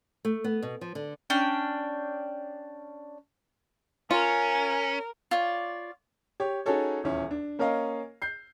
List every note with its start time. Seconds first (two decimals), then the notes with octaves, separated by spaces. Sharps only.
0.25 A3
0.44 B3
0.62 B2
0.81 F3
0.95 D3
1.30 C#4 D4 G5
4.11 C#4 F4 A#4 G#5
5.31 F4 C#5 D5
6.40 G4 C#5
6.66 C#4 D#4 F#4 G#4 A4 C#5
7.04 D#1 E2 C#4 E4
7.31 D4
7.59 A#3 C#4 A#4 C#5 D#5 F5
8.22 G6 C7